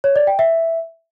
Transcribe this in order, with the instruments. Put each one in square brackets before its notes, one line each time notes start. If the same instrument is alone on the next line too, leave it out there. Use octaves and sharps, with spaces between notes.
[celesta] C#5
D5
G5
E5